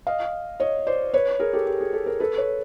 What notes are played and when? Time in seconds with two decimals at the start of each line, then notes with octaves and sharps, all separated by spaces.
0.07 D#5 F5
0.60 C#5 D#5
0.87 C5 D5
1.14 B4 C#5
1.40 G#4 A#4
1.53 G4 A4
1.66 G4
1.81 G#4
1.93 G4 A4
2.06 G#4 A#4
2.20 A4 B4
2.37 B4 C#5